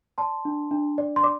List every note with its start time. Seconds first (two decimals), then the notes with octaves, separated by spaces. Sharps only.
0.18 D5 A5 C6
0.45 D4
0.71 D4
0.98 D5
1.16 C6
1.24 D5 D6